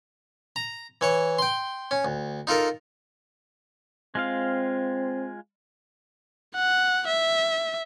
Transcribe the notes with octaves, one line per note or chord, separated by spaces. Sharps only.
A#5
E3 C#5 C#6
G5 C6
C#4
D2
D#4 F4 A4 A#4
G#3 C4 F4 F5
F#5
E5